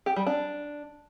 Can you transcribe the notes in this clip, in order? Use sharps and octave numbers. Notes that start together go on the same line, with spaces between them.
G4
G3
D4